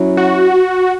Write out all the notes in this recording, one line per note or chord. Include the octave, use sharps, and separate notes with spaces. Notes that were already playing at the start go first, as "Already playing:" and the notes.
Already playing: F#3 C#4 E4
F#4